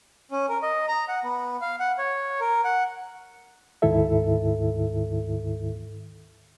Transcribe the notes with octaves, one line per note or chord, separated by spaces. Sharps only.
C#4
A#4
D#5
A#5
F#5
B3
F5
F#5
C#5
A#4
F#5
D2 G#2 D#3 E4 A4 E5